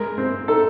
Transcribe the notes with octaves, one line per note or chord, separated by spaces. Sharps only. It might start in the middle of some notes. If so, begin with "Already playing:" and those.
Already playing: G#3 A#4
C4
D#4 A4